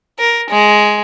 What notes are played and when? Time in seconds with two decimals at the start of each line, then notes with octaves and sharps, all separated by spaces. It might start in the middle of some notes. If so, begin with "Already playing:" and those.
0.19 A#4
0.50 G#3